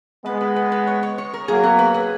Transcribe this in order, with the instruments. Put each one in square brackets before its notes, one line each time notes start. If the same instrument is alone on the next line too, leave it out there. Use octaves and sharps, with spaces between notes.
[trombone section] G#3 B3 [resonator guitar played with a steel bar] B4
[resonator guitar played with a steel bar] B4
B4
B4
C#5
C#5
C#5
A#4
[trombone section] F#3 A#3 [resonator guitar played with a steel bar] G#4
[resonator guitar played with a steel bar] B3
B4
G#4